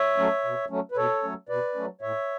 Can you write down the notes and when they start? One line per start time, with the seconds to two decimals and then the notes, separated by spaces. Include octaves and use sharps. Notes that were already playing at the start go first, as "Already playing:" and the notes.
Already playing: C#5 E5
0.18 F#3 A3 C#4
0.45 B2
0.70 F#3 A3 C#4
0.92 B4
0.96 B2 A4 C#5
1.23 F#3 A3 C#4
1.49 B2 B4 D5
1.75 F#3 A3 C#4
2.01 A2 C#5 E5